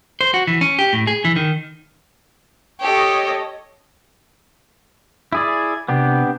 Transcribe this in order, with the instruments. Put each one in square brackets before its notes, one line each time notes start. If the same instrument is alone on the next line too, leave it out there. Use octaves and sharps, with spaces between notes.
[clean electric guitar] C5
F#4
E3
C#4
G4
A2
G#4
E3
D#3
[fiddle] G4 A4 [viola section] C#5 D#5
[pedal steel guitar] E4 G#4 D5 [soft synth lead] G#6
[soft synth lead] C3 [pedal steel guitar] B3 D4 G4